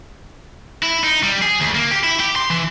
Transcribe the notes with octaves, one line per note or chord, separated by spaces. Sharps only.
E4
D#4
G3
G#4
D2
A#3
G4
E4
G4
C6
E3